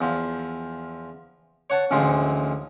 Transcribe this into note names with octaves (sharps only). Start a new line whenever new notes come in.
E2 F3
C#5 F#5 A5
A1 D2 A2 F3 G#3